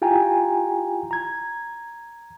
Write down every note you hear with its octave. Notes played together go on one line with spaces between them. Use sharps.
E4 F4 G4 G5 G#5 A#5
A#5 G#6